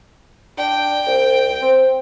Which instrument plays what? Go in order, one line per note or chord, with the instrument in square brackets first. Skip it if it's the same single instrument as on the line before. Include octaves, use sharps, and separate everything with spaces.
[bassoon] D4 [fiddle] G5
[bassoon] C2
C4